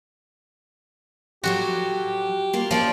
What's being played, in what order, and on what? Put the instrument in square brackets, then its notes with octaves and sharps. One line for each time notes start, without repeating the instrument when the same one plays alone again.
[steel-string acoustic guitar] A2 F3 F#3 [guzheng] F#4 [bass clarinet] G4
[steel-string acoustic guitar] A#3 F4
[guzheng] F3 F4 D5 [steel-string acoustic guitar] C#4 D4 C#5